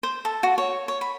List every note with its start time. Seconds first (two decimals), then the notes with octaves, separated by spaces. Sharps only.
0.03 C5
0.25 A4
0.43 F#4
0.58 C#5
0.88 C#5
1.01 B5